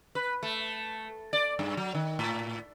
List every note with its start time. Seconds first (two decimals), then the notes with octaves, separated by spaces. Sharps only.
0.15 B4
0.43 A3
1.33 D5
1.59 G2
1.77 F#3
1.95 D#3
2.19 A2